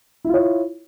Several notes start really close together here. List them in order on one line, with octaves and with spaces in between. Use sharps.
E4 F4 C#5